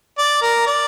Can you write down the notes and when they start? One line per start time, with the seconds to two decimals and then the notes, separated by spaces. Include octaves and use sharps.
0.18 D5
0.42 A#4
0.67 D5